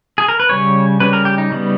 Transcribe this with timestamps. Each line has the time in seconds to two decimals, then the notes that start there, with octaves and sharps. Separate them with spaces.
0.18 G#4
0.28 A#4
0.40 B4
0.49 C#3 G3 C#4 C#5
1.00 C#3 G3 C#4 B4
1.13 A#4
1.25 G4
1.38 D#4
1.50 C#3 G3 B3